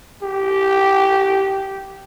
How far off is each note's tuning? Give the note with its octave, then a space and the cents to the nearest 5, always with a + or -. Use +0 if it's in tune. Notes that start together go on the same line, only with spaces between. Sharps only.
G4 -10